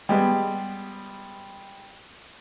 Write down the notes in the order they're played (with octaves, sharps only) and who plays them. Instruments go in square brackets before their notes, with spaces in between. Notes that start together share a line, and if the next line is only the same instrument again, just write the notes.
[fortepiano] G3 G#3 B3